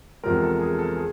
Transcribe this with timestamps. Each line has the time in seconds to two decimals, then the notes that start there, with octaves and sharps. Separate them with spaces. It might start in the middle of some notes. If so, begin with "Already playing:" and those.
0.23 E2 C3 F3 G#3 A#4
0.42 A4
0.60 G#4
0.79 A4
0.96 G#4